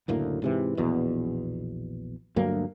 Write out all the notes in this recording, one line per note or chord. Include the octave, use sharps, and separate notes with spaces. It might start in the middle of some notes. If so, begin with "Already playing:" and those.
F#1 D2 A2 A#3
G#2 C3 E3
A#1 E2 B2
D2 G2 F#3 A#3